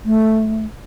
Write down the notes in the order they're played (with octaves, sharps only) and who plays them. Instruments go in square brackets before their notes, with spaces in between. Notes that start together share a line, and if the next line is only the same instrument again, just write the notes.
[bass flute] A3